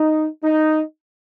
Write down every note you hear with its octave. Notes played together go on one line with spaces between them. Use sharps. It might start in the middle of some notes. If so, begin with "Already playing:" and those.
Already playing: D#4
D#4